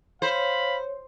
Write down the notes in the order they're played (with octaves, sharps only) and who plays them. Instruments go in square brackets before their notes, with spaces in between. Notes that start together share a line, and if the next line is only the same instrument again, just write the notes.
[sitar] C5 [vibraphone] C#5 [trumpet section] F5 B5